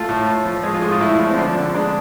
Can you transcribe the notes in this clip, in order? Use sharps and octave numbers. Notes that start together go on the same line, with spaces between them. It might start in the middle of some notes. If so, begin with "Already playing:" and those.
Already playing: A3 F4
A2
A2
F3
G#3 G#4
F4
A2 G#4
F4
A2 E4
F3
C4
D3 D4
D3
G#3 D4